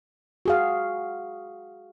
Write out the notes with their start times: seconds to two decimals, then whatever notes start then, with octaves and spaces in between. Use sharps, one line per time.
0.45 F#4 G#4 F5